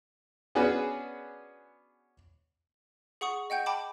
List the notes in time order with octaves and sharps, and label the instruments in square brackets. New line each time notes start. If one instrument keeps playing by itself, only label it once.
[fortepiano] B3 C#4 D4 F#4 G#4 B4
[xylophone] G#4 F#5 C#6 D#6
D#5 F#5 G5 G6
G5 A5 B5 D6